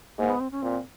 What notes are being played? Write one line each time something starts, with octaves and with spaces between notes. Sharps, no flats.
G#2 A#3
B3
C4
C#4
A#2 C4